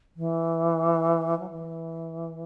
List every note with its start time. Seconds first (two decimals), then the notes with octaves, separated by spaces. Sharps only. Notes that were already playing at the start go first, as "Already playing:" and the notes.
0.16 E3
1.39 F#3
1.50 E3